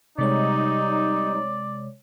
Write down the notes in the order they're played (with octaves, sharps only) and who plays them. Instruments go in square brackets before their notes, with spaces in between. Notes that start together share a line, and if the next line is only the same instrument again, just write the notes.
[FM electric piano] C3 G#3 C#5 [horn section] G3 D#4 [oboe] D5